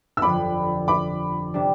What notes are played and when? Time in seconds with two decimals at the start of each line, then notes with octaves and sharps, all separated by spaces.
0.17 E6
0.22 G1 F2 D3 F3 B5 D6
0.88 B5 D6
1.54 C3 G3 D4